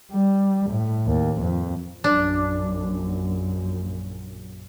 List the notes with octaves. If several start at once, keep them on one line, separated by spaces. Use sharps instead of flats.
G3
A2
D#2
F2
A#1 F#2 D4